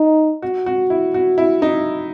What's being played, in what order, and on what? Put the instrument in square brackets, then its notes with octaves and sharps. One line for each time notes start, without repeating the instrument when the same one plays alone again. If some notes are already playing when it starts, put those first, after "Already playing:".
Already playing: [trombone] D#4
[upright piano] F#4
F#4
E4
F#4
E4
D#4